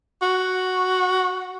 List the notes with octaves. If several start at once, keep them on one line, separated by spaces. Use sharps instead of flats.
F#4